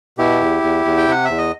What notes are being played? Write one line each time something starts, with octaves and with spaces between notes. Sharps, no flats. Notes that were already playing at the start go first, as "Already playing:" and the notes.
B2 E4 G4
E2
E2
E2
G5
C3 F#5
E5
E2
D#5